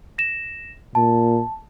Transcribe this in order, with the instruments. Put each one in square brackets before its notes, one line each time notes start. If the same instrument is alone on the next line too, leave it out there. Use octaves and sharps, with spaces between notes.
[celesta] A#6 E7
[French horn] A#2 [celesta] A5